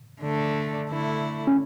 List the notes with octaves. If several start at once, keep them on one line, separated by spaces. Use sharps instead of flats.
D3 A3 D4
D3 A3 E4
C#4